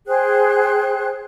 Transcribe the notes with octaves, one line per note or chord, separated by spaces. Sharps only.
G#4 C5 G5 F#6